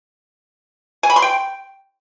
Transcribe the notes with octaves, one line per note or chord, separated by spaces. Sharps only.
G#5
B5
C6
G5